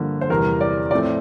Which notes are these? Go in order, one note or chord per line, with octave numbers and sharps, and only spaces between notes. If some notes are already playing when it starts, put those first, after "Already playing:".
Already playing: G2 D3 F3 A#3
C5
E2 C3 G3 A#4
D5
A2 F3 A3 C4 D5